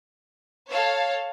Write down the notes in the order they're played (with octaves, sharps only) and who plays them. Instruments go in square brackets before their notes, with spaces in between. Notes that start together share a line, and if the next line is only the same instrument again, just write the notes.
[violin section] A4 C#5 F5